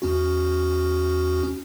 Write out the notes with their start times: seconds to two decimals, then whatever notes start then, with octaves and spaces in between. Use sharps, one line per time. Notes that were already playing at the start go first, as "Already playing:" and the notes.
0.02 E2 C#4 F#4